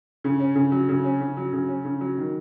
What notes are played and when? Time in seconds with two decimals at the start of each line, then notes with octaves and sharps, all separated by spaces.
0.24 C#3
0.40 C#4
0.55 C#3
0.71 F#3
0.89 C#3
1.04 C#4
1.21 C#3
1.37 F#3
1.53 C#3
1.69 C#4
1.85 C#3
2.00 F#3
2.18 D#3